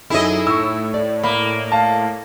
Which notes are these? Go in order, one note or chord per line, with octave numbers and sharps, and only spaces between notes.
F#2 D#4 E4 G#4 A4 D#5 E5
A2 C#6 E6
D5
A#3 B5
F5 A5